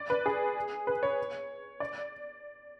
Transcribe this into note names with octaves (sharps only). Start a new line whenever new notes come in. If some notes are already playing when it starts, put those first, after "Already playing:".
Already playing: D5
B4
G#4
B4
C#5
D5